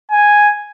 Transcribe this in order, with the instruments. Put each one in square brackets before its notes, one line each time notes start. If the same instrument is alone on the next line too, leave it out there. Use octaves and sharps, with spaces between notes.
[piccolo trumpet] G#5